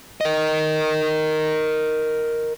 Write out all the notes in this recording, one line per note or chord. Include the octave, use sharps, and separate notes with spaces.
A#4 D#5